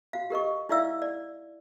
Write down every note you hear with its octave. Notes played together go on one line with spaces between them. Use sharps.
F#4 F5
G4 A#4 D#5 C#6
D#4 E4 D5 E5 F5 E6
D5